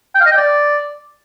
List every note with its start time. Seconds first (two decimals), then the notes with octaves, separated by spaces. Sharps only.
0.15 G5
0.20 F5
0.26 D#5
0.31 G5
0.37 D5